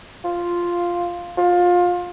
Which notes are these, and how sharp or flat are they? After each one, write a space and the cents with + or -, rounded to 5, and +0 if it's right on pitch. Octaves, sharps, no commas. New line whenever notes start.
F4 +0
F4 +25